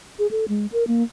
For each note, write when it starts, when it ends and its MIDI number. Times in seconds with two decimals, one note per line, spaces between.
0.19 0.27 68
0.31 0.48 69
0.48 0.67 56
0.72 0.87 70
0.88 1.03 58